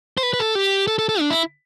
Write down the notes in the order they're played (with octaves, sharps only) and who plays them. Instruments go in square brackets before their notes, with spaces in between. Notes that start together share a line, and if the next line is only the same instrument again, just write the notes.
[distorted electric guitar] C5
B4
B4
A4
G4
A4
A4
A4
D4
E4